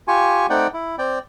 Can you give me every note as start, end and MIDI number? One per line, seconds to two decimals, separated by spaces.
0.08 0.47 65
0.08 0.47 67
0.08 0.47 80
0.08 0.47 85
0.50 0.67 57
0.50 0.67 60
0.50 0.67 63
0.50 0.67 74
0.50 0.67 78
0.50 0.67 79
0.74 0.96 64
0.98 1.19 60
0.98 1.19 74
0.98 1.19 79